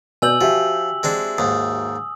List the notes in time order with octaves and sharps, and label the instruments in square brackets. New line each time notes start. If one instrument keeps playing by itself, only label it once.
[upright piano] B2 D5 G6 [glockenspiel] G#5 E6 F#7
[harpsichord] F3 [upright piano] F#4 G4 E5
[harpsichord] G#3 C4 D4
[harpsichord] D#2 G#2 [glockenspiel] D#6